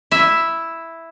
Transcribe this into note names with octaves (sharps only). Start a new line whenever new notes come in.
E4 E5